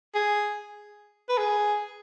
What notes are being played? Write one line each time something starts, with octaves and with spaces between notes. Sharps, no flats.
G#4
B4
G#4